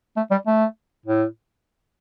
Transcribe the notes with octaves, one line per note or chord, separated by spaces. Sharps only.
A3
G3
A3
A2